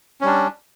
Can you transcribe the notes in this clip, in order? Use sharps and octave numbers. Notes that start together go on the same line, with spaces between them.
G3 C#4 D4